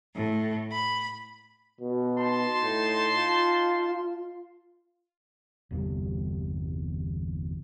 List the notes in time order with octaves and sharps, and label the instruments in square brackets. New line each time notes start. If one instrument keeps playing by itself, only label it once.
[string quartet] A2
B5
[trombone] B2
[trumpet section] D#4 A5 C6
[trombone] A2
F4
[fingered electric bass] G1 E2 C3 G3